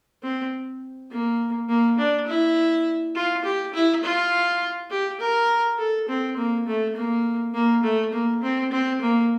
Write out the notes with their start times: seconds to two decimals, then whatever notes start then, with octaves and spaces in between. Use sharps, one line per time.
0.23 C4
1.11 A#3
1.68 A#3
1.98 D4
2.27 E4
3.15 F4
3.44 G4
3.74 E4
4.03 F4
4.90 G4
5.20 A#4
5.78 A4
6.09 C4
6.37 A#3
6.67 A3
6.95 A#3
7.54 A#3
7.83 A3
8.13 A#3
8.42 C4
8.72 C4
9.01 A#3